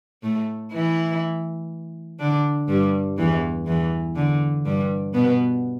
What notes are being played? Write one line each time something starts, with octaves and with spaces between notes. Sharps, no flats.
A2 A3
E3 E4
D3 D4
G2 G3
E2 E3
E2 E3
D3
G2 G3
B2 B3